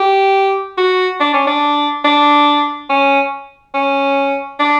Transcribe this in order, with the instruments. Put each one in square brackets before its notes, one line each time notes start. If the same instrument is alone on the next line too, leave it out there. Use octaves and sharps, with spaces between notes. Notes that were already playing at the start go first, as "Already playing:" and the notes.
Already playing: [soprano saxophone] G4
F#4
D4
C#4
D4
D4
C#4
C#4
D4